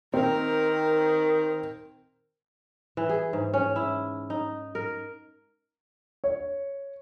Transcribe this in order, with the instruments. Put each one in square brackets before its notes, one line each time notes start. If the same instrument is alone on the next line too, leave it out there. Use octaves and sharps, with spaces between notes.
[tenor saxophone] D#3 [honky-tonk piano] C4 [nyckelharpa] A#4
[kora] E3
G#4
G#2
C#4
E4
D#4
A#4
[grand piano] C#5